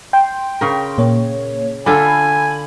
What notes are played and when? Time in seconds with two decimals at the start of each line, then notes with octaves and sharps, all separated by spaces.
0.13 G5 C6
0.61 C#3 A#4
0.98 A#2 A#3 C#5
1.86 D3 F4 A4 G#5 B5